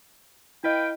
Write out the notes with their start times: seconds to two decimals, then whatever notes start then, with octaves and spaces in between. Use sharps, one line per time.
0.64 E4 B4 D#5 F5 G5